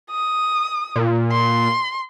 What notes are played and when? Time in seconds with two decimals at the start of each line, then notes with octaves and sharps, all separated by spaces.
0.10 D#6
0.96 A#2
1.32 C6